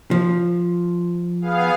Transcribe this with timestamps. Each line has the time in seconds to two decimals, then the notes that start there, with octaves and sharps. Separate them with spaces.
0.11 F3
1.41 B3 G#4 F5